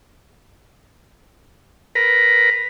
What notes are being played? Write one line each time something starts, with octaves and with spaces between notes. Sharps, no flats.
A#4 B4